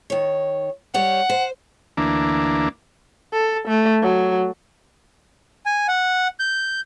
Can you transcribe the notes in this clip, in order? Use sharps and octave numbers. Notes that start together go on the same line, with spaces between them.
D#3 C#5
G3 C#5 F#5
C5
D2 E3 A#3 D4
A4
A3
F#3
G#5
F#5
G6